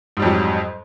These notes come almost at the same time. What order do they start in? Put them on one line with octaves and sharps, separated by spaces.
G#2 G3 F2 F#3